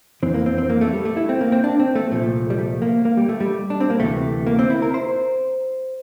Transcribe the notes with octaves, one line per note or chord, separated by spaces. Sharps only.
F2 E3 C4
A#3
C4
C4
A#3
A3
G3
A3
E4
C4
A#3
C4
D4
C4
A3
C2 A#2 F3 A3
G3
A3
A#3
A#3
G3
A3
G3
D4
C4
A#3
D2 C3 E3 A3
A#3
C4
E4
A#4
C5